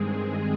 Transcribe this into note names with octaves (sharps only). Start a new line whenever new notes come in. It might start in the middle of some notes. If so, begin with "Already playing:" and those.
Already playing: G2 D#3 G#3 C4 G#4